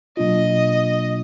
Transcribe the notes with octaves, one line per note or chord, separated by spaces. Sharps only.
B2 F#3 A#3 D4 F4 D#5